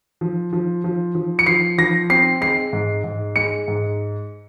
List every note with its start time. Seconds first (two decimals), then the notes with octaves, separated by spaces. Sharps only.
0.21 F3
0.53 F3
0.84 F3
1.15 F3
1.39 C#7
1.46 F3 C7
1.78 F3 A#6
2.10 C4 C7
2.41 G#3 C7
2.73 G#2
3.04 G#2
3.36 G#3 C#7
3.68 G#2